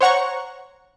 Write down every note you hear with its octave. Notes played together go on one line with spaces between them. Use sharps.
C5 C#5 F#5 A#5 C#6